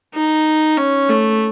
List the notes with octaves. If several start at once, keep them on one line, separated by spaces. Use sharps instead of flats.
D#4
C#4
A3